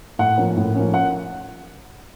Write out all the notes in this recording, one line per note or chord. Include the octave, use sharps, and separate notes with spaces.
A2 F#5
F3 A#3 C#4
A2
F3 A#3 C#4
F#5